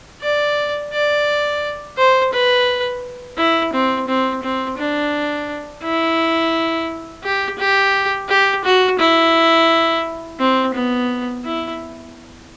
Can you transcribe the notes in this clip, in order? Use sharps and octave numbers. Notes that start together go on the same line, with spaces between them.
D5
D5
C5
B4
E4
C4
C4
C4
D4
E4
G4
G4
G4
F#4
E4
C4
B3
E4